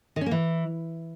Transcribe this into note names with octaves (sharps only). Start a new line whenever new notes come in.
D#3
C#4
A#3
E3